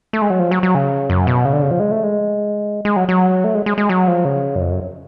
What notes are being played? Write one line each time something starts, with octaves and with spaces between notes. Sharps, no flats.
A3
G#3
F#3
F3
F#3
F#3
C#3
F#2
B2
C#3
D3
C#3
F3
G#3
A3
G#3
G#3
F#3
F#3
A3
G#3
G#3
G#3
F#3
F3
C#3
F#2
F2
F#2